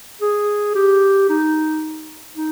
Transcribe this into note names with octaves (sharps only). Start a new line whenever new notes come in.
G#4
G4
D#4
D#4